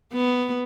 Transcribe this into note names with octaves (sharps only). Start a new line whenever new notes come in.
B3